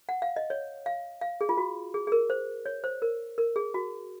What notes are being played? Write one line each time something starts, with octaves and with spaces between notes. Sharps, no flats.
F#5
F5
D#5
C#5
F5
F5
G#4
F4
F#4
G#4
G#4
A#4
C5
C#5
C5
A#4
A#4
G#4
F#4